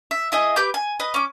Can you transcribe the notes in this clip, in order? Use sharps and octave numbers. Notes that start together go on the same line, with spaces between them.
E5
E4 G#4 D#5
G4 B4 D6 G6
G#5
B4 D#5
C#4 D6